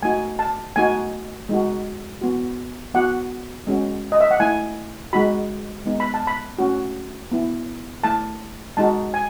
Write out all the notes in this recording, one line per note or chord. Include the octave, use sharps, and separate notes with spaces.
A3 D#4 F#4 G#5
A5
A3 D#4 F#4 G#5
G#3 D#4 F#4
B3 F#4
B3 F#4 F#5
G#3 C#4 F#4
D#5
E5
F#5
A3 E4 G#5
G#3 D#4 F#4 B5
G#3 B3 D#4
B5
A5
B5
A3 C#4 F#4
B3 E4
A3 E4 A5
G#3 D#4 F#4 A5
G#5